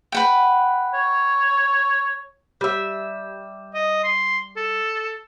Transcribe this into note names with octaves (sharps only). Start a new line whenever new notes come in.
B4 F#5 G5
C#5
G3 E5
D#5
C6
A4